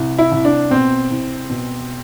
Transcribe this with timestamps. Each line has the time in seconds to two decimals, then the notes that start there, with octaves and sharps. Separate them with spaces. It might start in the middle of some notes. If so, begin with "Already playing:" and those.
Already playing: C2
0.18 E4
0.32 C2
0.45 D4
0.71 B2 C4
1.11 C2
1.50 B2